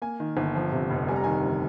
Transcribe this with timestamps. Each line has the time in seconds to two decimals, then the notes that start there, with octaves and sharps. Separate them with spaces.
0.02 A#3 G#5
0.20 D#3
0.37 G1
0.55 F3
0.72 C3
0.91 F1
1.08 G3 G#5
1.16 A#5
1.24 D#3 G#5
1.43 G1